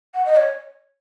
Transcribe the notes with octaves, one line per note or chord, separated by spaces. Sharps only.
F#5
D#5
C#5